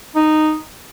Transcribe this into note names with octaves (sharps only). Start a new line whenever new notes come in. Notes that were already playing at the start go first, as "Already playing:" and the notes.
D#4